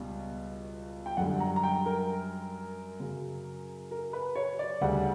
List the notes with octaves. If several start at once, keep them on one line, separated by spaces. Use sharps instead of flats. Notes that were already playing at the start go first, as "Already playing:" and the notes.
Already playing: C#2 B2 G3
G5
F#2 D3 G3 F#5
A#5
A#5
G5
A#4
F#2 C#3 F#3
A#4
B4
C#5
D5
D2 C#3 G3 F#5